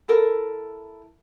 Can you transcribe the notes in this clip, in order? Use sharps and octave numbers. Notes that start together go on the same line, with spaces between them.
E4 A4 A#4